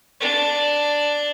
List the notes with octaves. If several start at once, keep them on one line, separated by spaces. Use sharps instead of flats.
D4